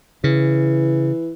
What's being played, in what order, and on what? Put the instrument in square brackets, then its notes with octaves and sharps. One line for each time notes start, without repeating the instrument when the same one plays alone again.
[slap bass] C#3 [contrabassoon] E3